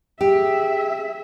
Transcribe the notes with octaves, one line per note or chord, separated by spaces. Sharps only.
G4 G#4 E5